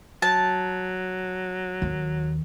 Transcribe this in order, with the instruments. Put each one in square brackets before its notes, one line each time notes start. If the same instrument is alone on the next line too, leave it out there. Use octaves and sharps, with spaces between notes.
[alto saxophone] F#3 [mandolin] A5
[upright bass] D#2